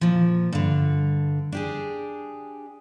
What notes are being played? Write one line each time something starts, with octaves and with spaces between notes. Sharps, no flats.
A#2 F3
G2 D3
D4 G4 G#4